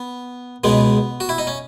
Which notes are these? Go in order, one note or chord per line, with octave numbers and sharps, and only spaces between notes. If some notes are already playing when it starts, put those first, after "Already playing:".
Already playing: B3
C#2 B2 G#3 B3
F#4
E4
D#4
C#4